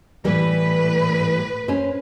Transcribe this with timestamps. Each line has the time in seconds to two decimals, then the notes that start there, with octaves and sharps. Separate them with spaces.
0.25 A2 E3 G3 B4
1.68 C#4 C5